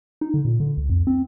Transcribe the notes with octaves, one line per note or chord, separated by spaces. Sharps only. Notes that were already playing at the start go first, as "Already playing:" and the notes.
D#4
D3
A#2
D3
C#2
F2
C4